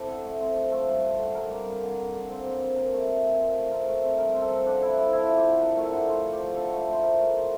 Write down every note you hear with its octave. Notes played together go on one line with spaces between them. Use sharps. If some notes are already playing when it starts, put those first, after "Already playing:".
Already playing: C4 E4 G4 A4
D3
A3
C4
F3
A3
G2
G2
D3
G2 A#4
A#3
G3
D3
D3
D3
C4
C4
C4
A#2 A#4
A3
A3
A#2
C4
A3
C4 A#4
A3
C4
G2 A#4
C4
A4
F3
D3 D4
D3 E4
F3 E4
F3 E4
F3
G4
D3
D3 A#4
A3
A4
D3
D3 F4
F3
G4
D3
D3 A4
A3
A3
C5
D3 A#4
A3
A3